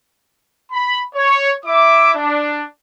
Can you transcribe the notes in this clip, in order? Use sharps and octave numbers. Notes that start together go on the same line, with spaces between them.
B5
C#5
E4 E5 D6
D4